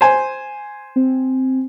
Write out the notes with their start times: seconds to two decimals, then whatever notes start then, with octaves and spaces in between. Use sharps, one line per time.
0.01 C5 G#5
0.96 C4